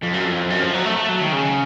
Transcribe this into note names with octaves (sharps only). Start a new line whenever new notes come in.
F2
F#2
F2
F#2
F3
F#3
A3
A3
F#3
D#3
C#3